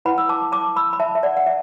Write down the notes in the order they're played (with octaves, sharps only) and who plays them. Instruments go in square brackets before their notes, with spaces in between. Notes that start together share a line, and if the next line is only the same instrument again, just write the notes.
[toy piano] E4 B4 F#5 B5
E6
A5 D6
A5 D6
B5 E6
B5
E5 A5
E5
D5 F#5
F#5
E5